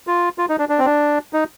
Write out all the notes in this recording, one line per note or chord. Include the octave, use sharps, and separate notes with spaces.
F4
F4
D#4
D4
D4
C4
D4
D#4